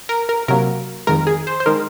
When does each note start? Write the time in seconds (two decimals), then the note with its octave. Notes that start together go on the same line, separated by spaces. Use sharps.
0.09 A#4
0.29 A#4
0.48 C3 F#3 A#3 A#4
1.07 F2 D#3 G#3 A#4
1.27 G#4
1.47 C5
1.60 C5
1.66 D#3 G#3 A#4